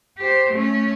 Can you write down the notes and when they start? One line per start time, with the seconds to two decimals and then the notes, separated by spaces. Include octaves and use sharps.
0.18 G4 C5
0.51 A3 C#4